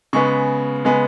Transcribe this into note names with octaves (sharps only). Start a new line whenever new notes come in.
C#3 G#3 B3 C#6
C#3 G#3 B3